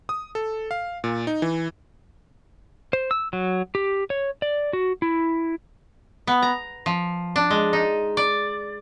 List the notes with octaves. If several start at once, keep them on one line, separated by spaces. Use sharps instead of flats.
D#6
A4
F5
A#2
D#4
E3
C5
E6
F#3
G4
C#5
D5
F#4
E4
B3
A#5
F3
D4
G#3
D#4
D5